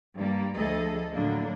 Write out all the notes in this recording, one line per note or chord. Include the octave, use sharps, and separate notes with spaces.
G2 G3 A#3
D2 F3 A3 G#4 A4 D#5
A2 D3 F#3 A#3 D4